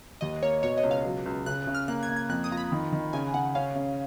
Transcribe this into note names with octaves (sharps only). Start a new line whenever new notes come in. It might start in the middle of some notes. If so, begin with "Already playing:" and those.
D#2 D#5
A#3 C#5
B2 C#5
D#5
C#2
F5
F#3
C#2
C#3 F#6
C#3
F6
A#3 F#6
G#6
A#3
G#6
F2 F#6
D#6
F4 A#5
B5
D#3
D#3
C#3 G#5
C#3 F#5
C#4 F5
C#3